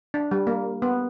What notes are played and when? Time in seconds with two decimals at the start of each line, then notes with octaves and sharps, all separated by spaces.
0.14 D4
0.31 G3
0.47 A#3
0.82 B3